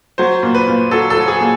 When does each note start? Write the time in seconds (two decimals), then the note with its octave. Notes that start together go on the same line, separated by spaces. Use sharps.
0.18 F#3 C5
0.43 A#2
0.55 B4
0.68 A#2
0.91 F#3 A4
1.10 A4
1.17 F#3
1.28 G#4
1.41 A#2